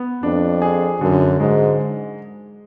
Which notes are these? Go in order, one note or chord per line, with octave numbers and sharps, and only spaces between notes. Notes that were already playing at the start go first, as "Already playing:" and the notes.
Already playing: B3
F2 D4
G#4
F#2 D3
G#2 G#3